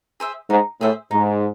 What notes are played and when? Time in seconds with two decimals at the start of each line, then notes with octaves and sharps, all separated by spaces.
0.20 G#4 C5 E5
0.49 G#2 D#4
0.81 A2 G#4 C5 E5
1.11 G#2 D#4